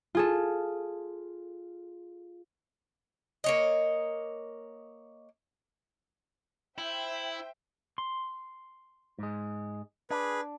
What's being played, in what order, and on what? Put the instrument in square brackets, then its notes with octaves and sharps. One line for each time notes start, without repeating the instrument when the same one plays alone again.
[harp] F4 G#4 A4
[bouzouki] A#3 C#5 D#5
[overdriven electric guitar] E4 [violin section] C5 E5 G5
[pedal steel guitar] C6
[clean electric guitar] G#2 G#3
[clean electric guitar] D4 [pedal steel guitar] G#4 [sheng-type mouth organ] B4